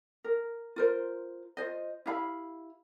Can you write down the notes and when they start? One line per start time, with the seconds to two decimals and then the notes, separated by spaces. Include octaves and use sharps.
0.24 A#4
0.76 F4 A#4 C5
1.57 F4 C5 D#5
2.06 E4 G4 F5 B5